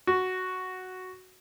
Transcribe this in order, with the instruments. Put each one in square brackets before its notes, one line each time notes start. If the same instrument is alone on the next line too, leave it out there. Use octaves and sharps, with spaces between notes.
[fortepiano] F#4